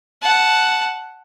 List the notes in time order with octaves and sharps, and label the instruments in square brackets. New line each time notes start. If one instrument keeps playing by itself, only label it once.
[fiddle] F#5 A5